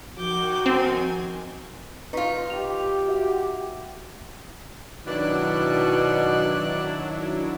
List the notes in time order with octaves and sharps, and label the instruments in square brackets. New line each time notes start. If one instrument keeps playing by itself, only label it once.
[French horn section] D#3 F#4 [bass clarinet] F3 [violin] D6 G6
[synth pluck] C4 [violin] G#5
[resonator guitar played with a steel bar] D#4 F4 [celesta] B4 C#6 B6
[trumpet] G4 [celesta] F7
[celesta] F#4 E5 F#5
[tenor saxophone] B2 [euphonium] D#3 [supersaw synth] F#3 D4 E4 [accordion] D5 F#6